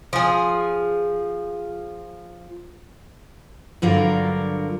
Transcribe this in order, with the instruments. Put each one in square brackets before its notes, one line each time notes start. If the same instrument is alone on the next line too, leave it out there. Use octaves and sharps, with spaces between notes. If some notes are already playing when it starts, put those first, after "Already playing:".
[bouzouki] F3 G#4
[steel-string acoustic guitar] G2 D3 F#3 F4 A#4 D5